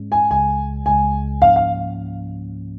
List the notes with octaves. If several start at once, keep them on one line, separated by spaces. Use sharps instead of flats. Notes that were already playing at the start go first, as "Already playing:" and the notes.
Already playing: G#2 G#3 C#4
G#5
C#2 C#3 G#3 G#5
C#2 C#3 G#3 G#5
G#2 F3 A#3 C#4 F5
F5